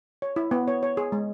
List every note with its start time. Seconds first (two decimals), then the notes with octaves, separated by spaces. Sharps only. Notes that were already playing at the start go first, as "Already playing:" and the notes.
0.22 C#5
0.36 E4
0.51 B3
0.68 C#5
0.83 C#5
0.97 G#4
1.12 G#3